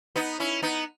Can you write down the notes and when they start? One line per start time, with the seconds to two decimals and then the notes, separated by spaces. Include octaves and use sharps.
0.16 B3 D#4
0.40 C#4 E4
0.62 B3 D#4